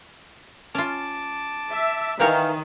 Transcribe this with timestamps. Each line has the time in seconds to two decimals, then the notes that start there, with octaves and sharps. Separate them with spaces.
0.75 C#4 F4 A5 D6
1.72 E5
2.20 D#3 E3 A#4 C#5 F5 G5